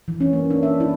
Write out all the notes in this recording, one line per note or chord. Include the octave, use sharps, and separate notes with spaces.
E3
C#4
A#3
D4
E5
E4